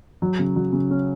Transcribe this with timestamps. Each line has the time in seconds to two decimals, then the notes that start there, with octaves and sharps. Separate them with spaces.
0.22 F#3
0.39 C#3
0.56 F#3
0.73 C#3
0.90 C#4